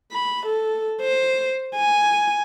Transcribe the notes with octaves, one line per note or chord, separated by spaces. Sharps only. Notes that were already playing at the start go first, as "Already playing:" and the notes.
B5
A4
C5
G#5